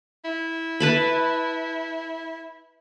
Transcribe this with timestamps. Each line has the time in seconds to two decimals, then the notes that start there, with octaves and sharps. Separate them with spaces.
0.24 E4
0.80 B4 A5 B5